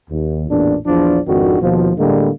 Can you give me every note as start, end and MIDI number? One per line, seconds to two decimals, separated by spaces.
0.10 0.45 39
0.49 0.75 33
0.49 0.75 40
0.49 0.75 46
0.49 0.75 62
0.86 1.19 34
0.86 1.19 40
0.86 1.19 53
0.86 1.19 62
1.27 1.59 32
1.27 1.59 41
1.27 1.59 51
1.27 1.59 62
1.27 1.59 66
1.61 1.91 39
1.61 1.91 47
1.61 1.91 53
1.98 2.30 45
1.98 2.30 50
1.98 2.30 55
1.98 2.30 56
1.98 2.30 58